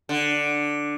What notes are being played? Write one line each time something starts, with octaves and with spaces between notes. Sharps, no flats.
D3